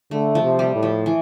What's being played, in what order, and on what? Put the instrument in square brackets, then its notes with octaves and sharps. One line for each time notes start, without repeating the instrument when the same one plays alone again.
[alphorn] D3 [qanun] A3
[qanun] F3
[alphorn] C3
[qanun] G3
[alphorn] A2
[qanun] F3
E3